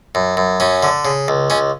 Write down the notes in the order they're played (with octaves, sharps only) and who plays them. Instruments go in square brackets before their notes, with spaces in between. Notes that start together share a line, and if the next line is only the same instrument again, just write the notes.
[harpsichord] F#2
F#2
F#2 C#4
D3
C#3
C#2
C#2 C#4